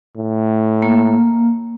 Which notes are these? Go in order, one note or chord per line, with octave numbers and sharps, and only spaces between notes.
A2
A#3